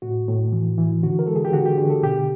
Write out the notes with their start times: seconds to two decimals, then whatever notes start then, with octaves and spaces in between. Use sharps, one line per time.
0.02 A2 F#4
0.28 A2
0.52 E3
0.78 E3
1.03 D3 F#4
1.19 A#4
1.27 G#3 A4
1.36 G#4
1.45 G4
1.52 D3 F#4
1.65 G4
1.78 D3 G#4
1.90 A4
2.03 B2 G4